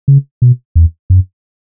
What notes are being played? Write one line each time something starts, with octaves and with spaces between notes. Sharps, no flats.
C#3
B2
E2
F#2